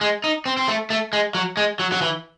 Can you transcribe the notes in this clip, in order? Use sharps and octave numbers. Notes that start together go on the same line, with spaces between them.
G#3
D#4
C4
C4
A3
A3
G#3
F#3
G#3
F#3
F#3
E3